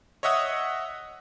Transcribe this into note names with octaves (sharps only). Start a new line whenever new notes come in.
C#5 D#5 E5 F#5 D#6